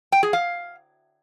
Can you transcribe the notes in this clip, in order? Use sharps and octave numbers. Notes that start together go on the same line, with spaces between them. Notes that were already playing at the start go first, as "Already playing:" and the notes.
G5
G#4
F5